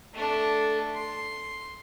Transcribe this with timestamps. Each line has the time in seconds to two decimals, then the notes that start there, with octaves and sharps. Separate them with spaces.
0.13 A3 D4
0.94 C6